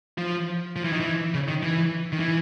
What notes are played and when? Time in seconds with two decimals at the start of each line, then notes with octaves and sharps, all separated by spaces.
0.18 F3
0.76 F3
0.84 E3
0.92 D#3
1.00 E3
1.34 C#3
1.48 D#3
1.63 E3
2.12 D#3
2.20 E3